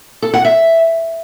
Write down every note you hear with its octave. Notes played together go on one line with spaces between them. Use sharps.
A4
F#5
E5